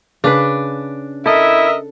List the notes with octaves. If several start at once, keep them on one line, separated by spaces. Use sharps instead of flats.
C#3 D4 B4
E4 A4 A#4 D#5 E5